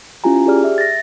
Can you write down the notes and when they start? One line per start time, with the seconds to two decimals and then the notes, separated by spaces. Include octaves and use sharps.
0.24 C#4 E4 F4 G4 G#5 A#5
0.46 G4 G#4 D5 F6
0.64 E5
0.78 A6 A#6